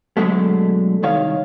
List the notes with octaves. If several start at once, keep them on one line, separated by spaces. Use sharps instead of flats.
B2 D3 F3 F#3 G#3 A3
C2 D#3 C#5 F5